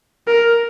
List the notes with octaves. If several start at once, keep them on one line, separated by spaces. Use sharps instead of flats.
A#4